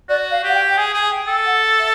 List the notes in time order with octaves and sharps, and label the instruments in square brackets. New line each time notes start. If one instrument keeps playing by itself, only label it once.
[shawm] F#4 [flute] D5
[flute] F5
[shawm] G4
[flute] F#5
G5
[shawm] G#4 [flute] G#5
[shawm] G#4 [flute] G#5
[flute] G5
[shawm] A4
[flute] F#5
E5